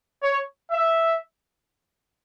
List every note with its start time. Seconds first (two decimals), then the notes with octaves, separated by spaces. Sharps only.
0.23 C#5
0.71 E5